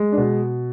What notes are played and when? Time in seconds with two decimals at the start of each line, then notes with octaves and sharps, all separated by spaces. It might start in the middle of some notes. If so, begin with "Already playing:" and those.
Already playing: G#3
0.12 D4
0.17 B2